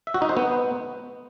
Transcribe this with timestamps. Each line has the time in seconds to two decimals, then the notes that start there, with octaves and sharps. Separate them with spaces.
0.07 E5
0.14 F#4
0.22 D#4
0.29 C5
0.37 B3